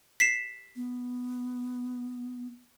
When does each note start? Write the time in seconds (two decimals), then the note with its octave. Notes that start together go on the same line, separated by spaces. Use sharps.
0.20 B6 C7 E7
0.76 B3